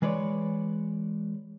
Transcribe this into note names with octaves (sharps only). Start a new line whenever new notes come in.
E3 G#3 B4 C#5 D5